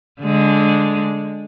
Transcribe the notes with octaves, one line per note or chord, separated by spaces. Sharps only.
D3 G#3